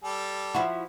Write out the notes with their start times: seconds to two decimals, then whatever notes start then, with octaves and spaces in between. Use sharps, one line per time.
0.04 G3 A4
0.55 F3 E4 F#4